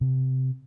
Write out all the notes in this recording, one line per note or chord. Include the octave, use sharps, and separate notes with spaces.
C3